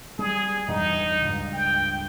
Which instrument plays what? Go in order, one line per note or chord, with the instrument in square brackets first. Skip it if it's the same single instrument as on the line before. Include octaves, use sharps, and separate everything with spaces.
[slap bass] G3 [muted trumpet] G#4
[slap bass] E2 G2 G3 [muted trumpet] D#4
[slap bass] C#2 G2
[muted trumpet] G5